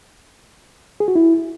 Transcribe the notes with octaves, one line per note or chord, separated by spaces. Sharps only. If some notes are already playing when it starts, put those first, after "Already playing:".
G#4
F#4
E4